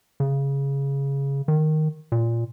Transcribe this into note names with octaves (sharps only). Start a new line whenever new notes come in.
C#3
D#3
A#2